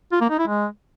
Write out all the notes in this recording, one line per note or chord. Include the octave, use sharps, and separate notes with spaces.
F4
A#3
D#4
E4
G#3